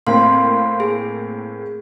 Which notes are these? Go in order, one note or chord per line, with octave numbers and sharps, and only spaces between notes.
A2 A#3 C4 F5 C6
G#4